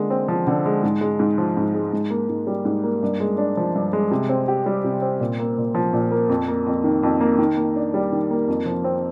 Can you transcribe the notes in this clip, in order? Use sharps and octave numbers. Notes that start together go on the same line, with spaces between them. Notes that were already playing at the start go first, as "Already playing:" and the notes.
Already playing: D3 G#3 A#3
C4
F3
D3
G#3
G#2
G#3
G#2
F3
G#2
G#3
G#2
A#3
G#2
G3
G#2
A#3
G2
G#3
D4
F3
G2
G#3
C3
C4
G4
G3
C3
C4
A#2
A#3
A#2
F3
A#2
A#3
F2
A#3
F2
D#3
F2
A#3
D#3
A#3
D4
G3
D#3
A#3
F2
F3
C4